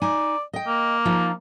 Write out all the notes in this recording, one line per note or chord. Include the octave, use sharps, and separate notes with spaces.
D#4 D5 G#5
D#5 G5
A#3
F3 D#4 F4